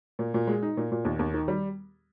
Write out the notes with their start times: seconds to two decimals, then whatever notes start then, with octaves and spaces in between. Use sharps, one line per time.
0.19 A#2
0.34 A#2
0.47 G#3
0.63 D#4
0.77 A#2
0.92 A#2
1.05 D#2
1.19 D#2
1.34 D#3
1.48 G3